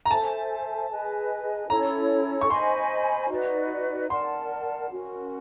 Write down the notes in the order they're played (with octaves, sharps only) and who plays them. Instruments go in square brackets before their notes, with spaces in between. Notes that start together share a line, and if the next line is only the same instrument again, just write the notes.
[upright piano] A#5
[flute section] A4 C5 E5 G#5 [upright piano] A5
[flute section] G#4 B4 D#5 G#5
[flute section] C#4 E4 A4 C#5 [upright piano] A#5
[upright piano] C#6
[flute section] C5 D#5 G#5 B5 [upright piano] C6
[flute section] D#4 F#4 B4 D5
[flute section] A#4 D5 F#5 A5 [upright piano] C6
[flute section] C#4 F#4 A#4